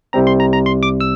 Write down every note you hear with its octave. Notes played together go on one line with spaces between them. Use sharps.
C2 C3 G3 C4 A#5
C6
A#5
A#5
C6
D6
E6